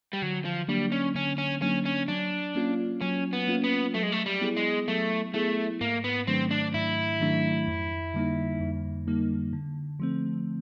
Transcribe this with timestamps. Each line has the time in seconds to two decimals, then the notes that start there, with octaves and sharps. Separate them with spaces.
0.13 G3
0.22 D3 F#3
0.45 F3
0.68 F#3 G3 A#3 D4
0.92 C#4
1.15 D3 C#4
1.38 C#4
1.62 F#3 A#3 C#4 D4
1.85 C#4
2.08 F#3 D4
2.55 A#3 C#4 F4
3.01 F#3 C#4
3.33 B3
3.48 A#3 C#4 F4
3.64 B3
3.94 F#3 A3
4.03 G#3
4.12 A3
4.26 G3
4.41 B3 E4 G#4
4.57 G#3
4.88 F#3 A3
5.34 A3 B3 E4 G#4
5.81 G#2 A#3
6.04 B3
6.27 D#3 F#3 A3 C4 D4
6.51 D4
6.74 G#2 E4
7.21 D#3 F#3 A3 D4
7.68 F2
8.14 D3 G3 A#3 D#4
8.60 F2
9.07 D3 G3 A#3 D#4
9.53 D3
10.00 F3 A3 C4